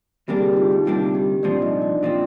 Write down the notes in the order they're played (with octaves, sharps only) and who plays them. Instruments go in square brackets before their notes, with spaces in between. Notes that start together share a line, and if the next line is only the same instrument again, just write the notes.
[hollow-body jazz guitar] D2 C3 G3 A#3 D4 [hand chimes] G4
[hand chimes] G#4
G4
D#4
F4
D#4
[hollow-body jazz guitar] D2 C3 G3 A#3 D4 [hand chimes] F4
[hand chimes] G4
[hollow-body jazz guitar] C2 A#2 F3 C4 [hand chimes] D4 D5
[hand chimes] D#4 D#5
D4 D5
[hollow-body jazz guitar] A#2 F3 C4